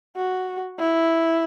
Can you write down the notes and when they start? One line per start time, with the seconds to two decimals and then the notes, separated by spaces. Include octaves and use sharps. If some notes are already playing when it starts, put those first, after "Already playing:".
0.17 F#4
0.79 E4